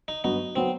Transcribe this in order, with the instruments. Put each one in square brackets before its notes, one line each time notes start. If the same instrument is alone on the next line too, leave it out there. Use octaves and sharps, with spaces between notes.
[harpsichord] D#4
[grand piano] G2 F#3 B3 F#4 [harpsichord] D#4
[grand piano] F#3 B3 F#4 [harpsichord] C4